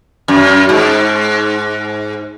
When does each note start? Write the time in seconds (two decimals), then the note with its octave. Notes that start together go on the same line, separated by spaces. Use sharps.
0.28 F#2
0.69 G#2